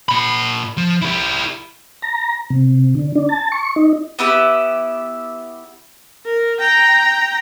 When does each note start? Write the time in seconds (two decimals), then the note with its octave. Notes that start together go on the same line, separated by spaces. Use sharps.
0.09 A#2 B5
0.77 F3
1.02 E4 G4
2.02 A#5
2.50 C3
2.95 D3
3.15 D4
3.29 A5
3.52 C#6
3.76 D#4
4.19 B3 E4 G4
6.25 A#4
6.60 G5 A#5